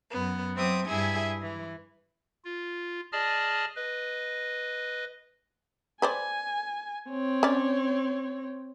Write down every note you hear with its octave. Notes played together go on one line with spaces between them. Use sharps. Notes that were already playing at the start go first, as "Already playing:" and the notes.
F#2 B3
F#3 C4 E5 D6 D#6
G2 E4 G#4 E5 G#5
E3
F4
G#4 D5 D#5 A5 F6
B4 D#5
B4 C5 D5 G#5
C4 C#5
C#4 D5